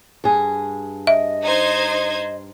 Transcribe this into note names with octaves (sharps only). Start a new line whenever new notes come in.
G2 G#4
D#5 E5
D#4 C5 G#6